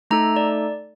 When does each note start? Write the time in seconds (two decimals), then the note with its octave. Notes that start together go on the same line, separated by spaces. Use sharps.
0.11 A3 D#4 A4 A#5
0.36 D5